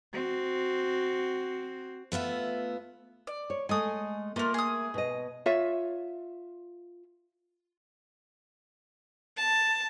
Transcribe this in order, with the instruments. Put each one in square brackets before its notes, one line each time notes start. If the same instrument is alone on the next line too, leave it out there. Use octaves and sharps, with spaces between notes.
[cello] C4 F#4
[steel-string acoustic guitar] A3 B3 F4 E5
[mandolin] D5
[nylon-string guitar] C#5
[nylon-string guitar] G#3 A3 [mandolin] G#5 D#6
[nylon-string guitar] A3 A#3 [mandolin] F4 A#4
[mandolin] G#4 D#6
[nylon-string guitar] B2 D#5
[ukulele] F4 C#5 E5
[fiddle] A5